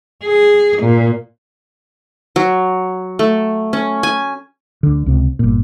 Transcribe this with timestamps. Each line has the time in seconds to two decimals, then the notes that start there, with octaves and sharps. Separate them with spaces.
0.23 G#4
0.80 A#2
2.36 F#3
3.19 A3
3.73 C#4
4.03 G#5
4.83 D2 D3
5.06 C#2 C3
5.39 G1 A#2